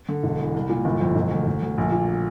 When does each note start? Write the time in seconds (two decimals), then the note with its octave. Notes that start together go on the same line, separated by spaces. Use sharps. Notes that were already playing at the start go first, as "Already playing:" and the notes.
0.09 D3
0.23 E1
0.39 E2
0.54 C2
0.69 A#2
0.85 G1
1.01 F2
1.15 E1
1.31 D2
1.47 E1
1.62 D2
1.78 A#1
1.92 A#2